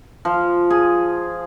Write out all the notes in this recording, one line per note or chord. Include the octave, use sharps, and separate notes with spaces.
F3
G#4